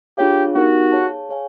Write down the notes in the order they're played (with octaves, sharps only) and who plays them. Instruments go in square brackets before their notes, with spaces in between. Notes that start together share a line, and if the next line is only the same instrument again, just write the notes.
[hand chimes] D4 F4 G#4 C#5 F5 [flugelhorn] G4
[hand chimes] B3 D#4 G4 A#4 [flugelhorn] F#4
[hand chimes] G#4 C#5 F5 A5
G#4 C#5 F5 G#5